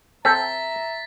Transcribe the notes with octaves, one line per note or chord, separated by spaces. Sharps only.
C4 A4 E5 A#5 A6 B6